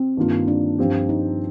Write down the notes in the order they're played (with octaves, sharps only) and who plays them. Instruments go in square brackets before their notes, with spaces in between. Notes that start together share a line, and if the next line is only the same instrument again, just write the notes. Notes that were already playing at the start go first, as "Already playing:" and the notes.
Already playing: [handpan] C4
[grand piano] G2 D#3 A#3 F4
[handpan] D4
[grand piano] G2 F3 C4 G4
[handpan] D#4